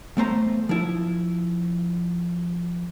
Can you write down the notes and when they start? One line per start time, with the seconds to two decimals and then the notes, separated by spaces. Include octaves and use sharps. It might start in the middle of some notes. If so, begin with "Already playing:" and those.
0.17 E2 A3 C5 A#5
0.69 F3 E4